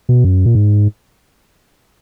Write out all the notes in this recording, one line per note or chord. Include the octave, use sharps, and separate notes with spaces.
B2
F#2
A#2
G#2